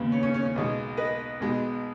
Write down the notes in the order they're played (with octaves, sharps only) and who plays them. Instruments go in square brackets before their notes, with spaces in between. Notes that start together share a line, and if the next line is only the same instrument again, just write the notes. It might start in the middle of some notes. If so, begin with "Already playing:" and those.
Already playing: [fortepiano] D#2 C#3 G#3 B3
C#4
C#4
C#4
C#4
B1 B2 G#3
B4 D#5
B1 B2 G#3